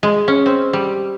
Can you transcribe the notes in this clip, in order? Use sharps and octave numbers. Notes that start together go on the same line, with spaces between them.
G#3
C#4
C4
G3